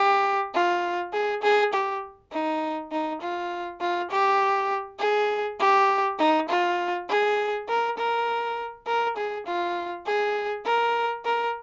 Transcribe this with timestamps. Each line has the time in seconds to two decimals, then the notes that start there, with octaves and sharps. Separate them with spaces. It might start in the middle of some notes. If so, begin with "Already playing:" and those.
Already playing: G4
0.54 F4
1.13 G#4
1.42 G#4
1.73 G4
2.32 D#4
2.92 D#4
3.21 F4
3.80 F4
4.11 G4
4.99 G#4
5.59 G4
6.19 D#4
6.49 F4
7.09 G#4
7.68 A#4
7.98 A#4
8.87 A#4
9.17 G#4
9.47 F4
10.06 G#4
10.65 A#4
11.25 A#4